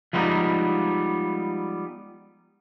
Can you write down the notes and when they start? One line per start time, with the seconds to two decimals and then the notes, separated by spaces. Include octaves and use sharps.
0.13 F3 G3 G#3 A#3 B3 D#4